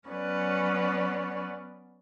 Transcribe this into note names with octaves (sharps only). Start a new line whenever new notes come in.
F#3 B3 C#4 B4 D5